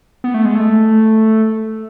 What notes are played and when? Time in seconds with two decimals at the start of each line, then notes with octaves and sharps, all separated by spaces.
0.24 B3
0.34 A3
0.45 G#3
0.55 A3